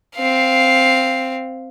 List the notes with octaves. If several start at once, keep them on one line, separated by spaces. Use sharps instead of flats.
C4 F5